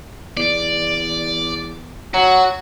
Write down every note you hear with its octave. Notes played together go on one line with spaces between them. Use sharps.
E2 D5
F#3 F#4